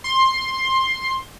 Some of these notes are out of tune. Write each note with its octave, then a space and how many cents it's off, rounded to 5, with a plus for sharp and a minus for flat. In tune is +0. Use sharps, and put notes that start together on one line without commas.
C6 +15